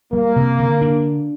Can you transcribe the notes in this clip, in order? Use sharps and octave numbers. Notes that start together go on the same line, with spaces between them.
G3 A#3
C3
D3
D4